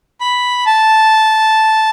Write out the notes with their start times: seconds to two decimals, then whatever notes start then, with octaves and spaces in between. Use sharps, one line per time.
0.21 B5
0.66 A5